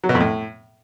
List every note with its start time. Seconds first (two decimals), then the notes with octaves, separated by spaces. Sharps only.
0.04 F#3
0.09 B2
0.15 F2
0.20 A2